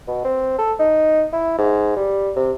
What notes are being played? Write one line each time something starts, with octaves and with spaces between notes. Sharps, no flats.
B2
C4
A4
D#4
E4
G#2
G3
C3